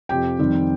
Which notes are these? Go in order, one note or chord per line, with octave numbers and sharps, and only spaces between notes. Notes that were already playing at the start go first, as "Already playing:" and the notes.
F2 C3 F3 G4 G5
F2 D#3 G3 C4 D#4